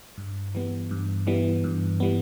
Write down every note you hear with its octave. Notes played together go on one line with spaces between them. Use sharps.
G2
E3 G3 B3
G2
E3 G3 B3
G2
E3 G3 B3